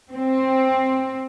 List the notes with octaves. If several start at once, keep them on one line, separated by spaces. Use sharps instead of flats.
C4